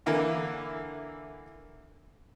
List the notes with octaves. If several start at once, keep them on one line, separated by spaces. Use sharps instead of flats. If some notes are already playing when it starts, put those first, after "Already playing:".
D3 E3 A#3 E4